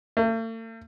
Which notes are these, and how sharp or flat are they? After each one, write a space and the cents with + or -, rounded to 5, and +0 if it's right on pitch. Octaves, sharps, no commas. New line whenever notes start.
A3 +45